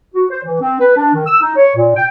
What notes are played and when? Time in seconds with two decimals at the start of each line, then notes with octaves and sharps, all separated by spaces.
0.14 F#4
0.30 C5
0.44 E3
0.61 C4
0.80 B4
0.97 D4
1.14 D#3
1.26 E6
1.41 D#4
1.56 C#5
1.76 A#2
1.96 G5